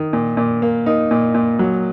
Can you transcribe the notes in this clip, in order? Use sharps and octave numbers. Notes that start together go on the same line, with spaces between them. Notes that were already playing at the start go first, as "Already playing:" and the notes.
Already playing: D#3
A#2
A#2
A#3
A#3 D#4
A#2
A#2
F#3